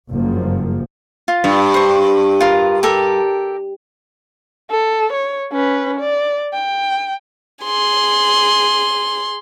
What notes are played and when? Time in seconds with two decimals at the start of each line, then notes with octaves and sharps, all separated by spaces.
0.10 F#1 G2 F3 A#3
1.28 F4
1.44 G2
1.74 C5 C#6
2.41 F4 A#4
2.83 G4 A4 A#4
4.71 A4
5.13 C#5
5.52 C#4 B4
5.99 D5
6.53 G5
7.63 G#4 C6